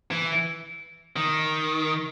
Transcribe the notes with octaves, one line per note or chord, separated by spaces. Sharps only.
E3
D#3